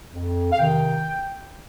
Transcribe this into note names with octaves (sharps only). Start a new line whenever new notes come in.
F2
F5
C3 D#3 G5